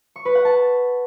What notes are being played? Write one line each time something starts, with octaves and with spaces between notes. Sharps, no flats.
C#6
B4
F#5
A5